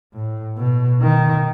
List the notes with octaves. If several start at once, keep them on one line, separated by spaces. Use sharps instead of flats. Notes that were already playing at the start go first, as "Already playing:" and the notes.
A2
B2
D#3